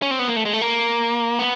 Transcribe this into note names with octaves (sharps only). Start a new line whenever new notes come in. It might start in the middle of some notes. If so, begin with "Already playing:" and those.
C#4
C4
B3
A#3
A3
G#3
A3
A#3
B3